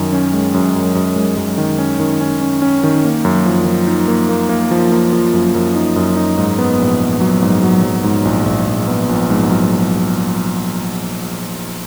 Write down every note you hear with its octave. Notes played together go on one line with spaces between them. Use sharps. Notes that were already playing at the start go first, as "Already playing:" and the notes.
Already playing: F#2 D#3
C#4
G#3
F#2
F#2
F#2
G#3
F#2
D#3
C#4
D#3
C#4
C#4
C#4
D#3
A#3
F#2
F3
F3
D#4
A#3
A#3
A#3
F3
A#3
F3
F#2
F#2
D#4
F#2
D#4
G#2
B3
A#1
B3
F#3
G#2
F#3
F#3
G#2
A#1
A#1
A#1
B3
A#1
G#2
F#3